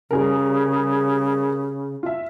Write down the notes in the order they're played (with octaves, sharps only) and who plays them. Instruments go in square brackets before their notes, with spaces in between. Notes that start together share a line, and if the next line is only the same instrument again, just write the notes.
[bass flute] C#3 [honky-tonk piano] G3 G#4 A#4
[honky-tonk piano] F4 E5